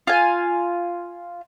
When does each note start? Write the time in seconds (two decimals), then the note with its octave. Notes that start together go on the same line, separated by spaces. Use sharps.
0.07 F4 G#5